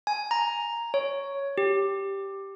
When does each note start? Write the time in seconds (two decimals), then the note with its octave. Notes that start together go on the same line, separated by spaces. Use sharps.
0.07 G#5
0.31 A#5
0.94 C#5
1.58 G4